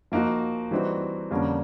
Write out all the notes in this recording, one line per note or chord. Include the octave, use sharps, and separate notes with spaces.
F3 A#3 D#4 F#4
E3 G3 C4 D#4 F#4
F2 D3 G3 A#3 C#4